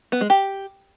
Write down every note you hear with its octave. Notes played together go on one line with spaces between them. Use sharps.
B3
G#3
G4